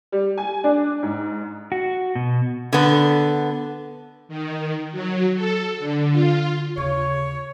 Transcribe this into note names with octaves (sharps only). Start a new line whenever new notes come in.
G3
G#5
D4
G#2
F#4
B2
D3 B3
D#3
F#3
A4
D3
F4
D#2 C#3 C#5